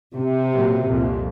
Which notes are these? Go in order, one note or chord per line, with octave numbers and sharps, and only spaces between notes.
C3
A#2 F#3
C2 F2 A#2